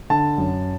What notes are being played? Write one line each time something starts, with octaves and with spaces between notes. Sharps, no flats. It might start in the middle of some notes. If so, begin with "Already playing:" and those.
D3 A5
F#2